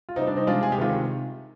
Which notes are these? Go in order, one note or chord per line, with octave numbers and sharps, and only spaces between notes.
F4
C3 G3 C4 D#4
D4
C4 D#4
C3 F3 G#3 D4 F4
G#4
G4
C3 D#3 G#3 F4